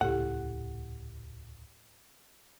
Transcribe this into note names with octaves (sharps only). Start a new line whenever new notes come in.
D#1 C#2 A2 E4 G4 A4 F#5